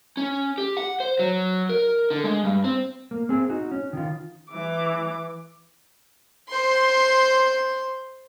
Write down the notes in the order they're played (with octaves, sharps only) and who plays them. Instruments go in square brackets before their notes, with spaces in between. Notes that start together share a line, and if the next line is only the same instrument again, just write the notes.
[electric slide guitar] C#4
G4
F#5
C5
F#3
A#4
D3
G#3
G2
C4
A#3
C4 G#4
D#4 F#4
C#4
D#3 F4
[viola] E3 D6
[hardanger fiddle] C5 C6